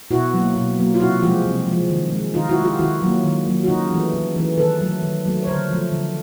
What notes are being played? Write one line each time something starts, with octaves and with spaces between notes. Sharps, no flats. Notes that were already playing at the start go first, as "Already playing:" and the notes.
B2 E4 F#4
F#3 A#3
B2
F#3 A#3
F4
C3 E4 F#4
F3 G#3 F4 G4
C3
F3 G#3
D#3
G#3
D#3 D#4 F4
E4 F#4
G#3
F4 G4
D#3 E4 F#4
F#3 A#3
D#3
F#3 A#3
F#4
C#3 D#4 F4
E3 A3
C#3
E3 A3
D#3 A4 B4
F#3 A3
D#3
F#3 A3
C#5
D3 A#4 C5
F3 A3
D3